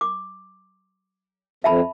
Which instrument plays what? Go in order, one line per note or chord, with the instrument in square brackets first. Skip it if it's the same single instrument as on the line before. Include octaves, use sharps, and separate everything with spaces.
[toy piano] D6
[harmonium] F2 [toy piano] E5 A5 B5